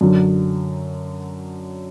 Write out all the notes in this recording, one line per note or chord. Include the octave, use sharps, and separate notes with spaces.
F#2 D3 F#3